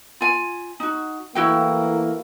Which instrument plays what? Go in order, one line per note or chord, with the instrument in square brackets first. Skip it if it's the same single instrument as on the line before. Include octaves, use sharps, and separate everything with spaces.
[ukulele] F4 G#5
D#4 F#4
[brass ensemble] E3 A3 A#3 [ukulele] E4 F#4 G5